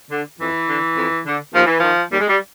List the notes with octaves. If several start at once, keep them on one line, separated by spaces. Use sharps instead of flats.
D3
F2 E3
D3
F2
D3
D#2 F3
E3
F3
D#3
D#2 G3
G#3
G3